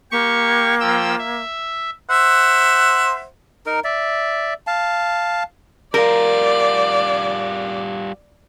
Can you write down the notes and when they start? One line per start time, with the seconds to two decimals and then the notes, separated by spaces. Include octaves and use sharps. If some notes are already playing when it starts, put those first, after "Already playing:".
0.11 A#3 G4 C#6
0.80 F3 G5 E6
1.18 E5
2.10 C5 E5 F#5
3.66 D#4 A#4
3.84 D5 E5
4.67 F5 A5
5.94 G3 F4 A#4 D5